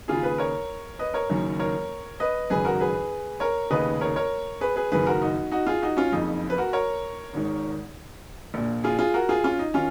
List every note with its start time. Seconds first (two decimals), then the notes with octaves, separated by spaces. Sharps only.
0.08 D#2 C#3 F4 G#4
0.23 G#4 B4
0.38 A#4 C#5
0.99 B4 D#5
1.14 A#4 C#5
1.30 F#1 F#2 D#3
1.59 A#4 C#5
2.20 B4 D#5
2.50 G#1 F#2 C#3 G#4 B4
2.65 F#4 A#4
2.80 G#4 B4
3.40 A#4 C#5
3.70 F1 D#2 C#3 B4 D#5
4.01 A#4 C#5
4.16 A#4 C#5
4.61 G#4 B4
4.76 G#4 B4
4.92 F#1 F#2 D#3 G#4 B4
5.07 F#4 A#4
5.22 D#4 F#4
5.51 D#4 F#4
5.67 F4 G#4
5.82 D#4 F#4
5.97 C#4 F4
6.12 F#1 F2 C#3 D#4
6.50 B4
6.58 F#4 A#4
6.73 A#4 C#5
7.33 G#1 G#2 D#3
8.54 A#1 A#2
8.84 F4 G#4
8.99 F4 G#4
9.14 F#4 A#4
9.29 F4 G#4
9.44 C#4 F4
9.59 D#4
9.74 D#3 C#4 F4